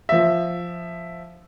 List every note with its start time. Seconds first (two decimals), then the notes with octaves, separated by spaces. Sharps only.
0.09 F3 E5